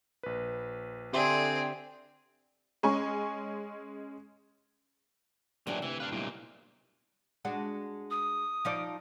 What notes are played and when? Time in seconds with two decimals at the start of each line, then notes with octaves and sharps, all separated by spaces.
0.23 A#1 B4
1.13 D3 C4 G4 G#4 D5 E5 C6
2.83 G#3 C#4 G#5 C#6
5.67 A#2 E3 F#3 A3 D4 G4
5.82 D2 C3 E3
6.00 D4 B4 F5
6.12 B1 A#2 G3 E4
7.45 G#3 D4 F#4
8.11 D#6
8.65 F3 D#4 D5